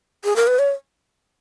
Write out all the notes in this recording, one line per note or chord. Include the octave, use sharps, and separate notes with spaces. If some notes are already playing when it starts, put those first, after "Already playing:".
G#4
A#4
B4
C#5